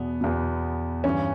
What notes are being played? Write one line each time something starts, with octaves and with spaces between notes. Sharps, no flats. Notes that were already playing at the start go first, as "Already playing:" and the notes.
Already playing: E2 B2 B3
E2 B2
G2 E3 C#4